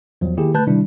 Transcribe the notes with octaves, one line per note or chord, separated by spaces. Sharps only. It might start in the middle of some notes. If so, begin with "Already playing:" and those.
E2 F3 F#3
D#3 A#3 E4 G4 G#4
D3 A3 B4 A5 F#6 G6
C3 D#3 G3 D4 E4